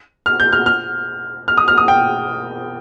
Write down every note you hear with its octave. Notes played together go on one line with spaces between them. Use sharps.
F6
G6
F6
F6
F6
D#6
F6
D#6
G5